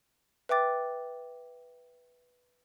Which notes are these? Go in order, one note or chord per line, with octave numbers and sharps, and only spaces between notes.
B4 E5 G5 D6 A6